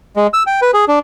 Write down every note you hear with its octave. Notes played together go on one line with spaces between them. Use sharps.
G#3
E6
G5
B4
G#4
D4